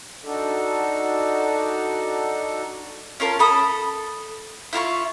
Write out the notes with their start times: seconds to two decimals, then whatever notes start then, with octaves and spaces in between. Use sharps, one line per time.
0.25 D4 D#4 F#4 A4 D5
3.20 C#4 F4 A#4 A5
3.39 A4 A5 B5 D#6
4.73 E4 F4 A#5 C#6